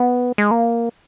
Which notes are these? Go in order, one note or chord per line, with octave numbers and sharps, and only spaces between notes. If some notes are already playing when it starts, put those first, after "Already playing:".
Already playing: B3
G#3
A#3